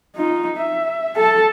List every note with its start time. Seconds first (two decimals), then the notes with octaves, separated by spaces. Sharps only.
0.16 D#4 F4
0.57 E5
1.16 A4 A5